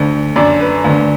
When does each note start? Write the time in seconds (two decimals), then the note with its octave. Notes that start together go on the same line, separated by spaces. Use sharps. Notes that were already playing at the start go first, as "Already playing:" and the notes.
Already playing: D2 D3
0.36 F#2 D3 D5
0.61 B4
0.84 D2 D3